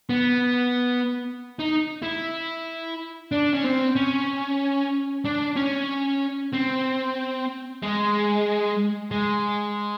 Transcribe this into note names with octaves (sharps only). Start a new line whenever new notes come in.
B3
D#4
E4
D4
C#4
C4
C#4
D4
C#4
C4
G#3
G#3